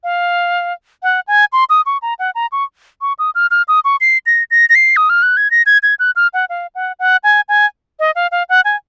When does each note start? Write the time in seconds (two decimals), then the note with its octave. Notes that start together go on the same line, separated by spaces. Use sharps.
0.04 F5
1.03 F#5
1.28 G#5
1.53 C6
1.70 D#6
1.86 C#6
2.02 A#5
2.19 F#5
2.35 A#5
2.52 C#6
3.01 C#6
3.19 D#6
3.35 F6
3.51 F6
3.68 D#6
3.85 C#6
4.01 C7
4.26 A#6
4.51 A#6
4.69 A#6
4.75 C7
4.97 D#6
5.10 F6
5.23 F#6
5.37 G#6
5.51 A#6
5.66 G#6
5.83 G#6
5.99 F#6
6.16 F6
6.34 F#5
6.49 F5
6.75 F#5
6.99 F#5
7.24 G#5
7.49 G#5
8.00 D#5
8.15 F5
8.32 F5
8.49 F#5
8.65 G#5